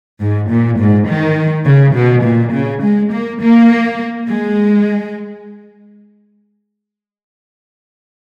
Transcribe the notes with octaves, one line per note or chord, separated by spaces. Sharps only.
G#2
A#2
G#2
D#3
C#3
B2
A#2
C#3
G#3
A#3
A#3
G#3